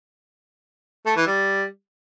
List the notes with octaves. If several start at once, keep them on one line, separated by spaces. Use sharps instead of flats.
A3
E3
G3